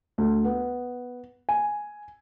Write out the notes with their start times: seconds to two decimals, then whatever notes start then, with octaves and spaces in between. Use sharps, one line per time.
0.18 D2
0.45 B3
1.49 G#5